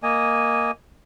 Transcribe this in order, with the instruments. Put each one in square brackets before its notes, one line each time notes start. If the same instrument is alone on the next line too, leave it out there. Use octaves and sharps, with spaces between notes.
[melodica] A#3 D#5 G#5